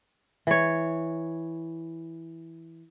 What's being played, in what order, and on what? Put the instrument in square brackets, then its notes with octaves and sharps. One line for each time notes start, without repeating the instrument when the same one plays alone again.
[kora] E3 C#5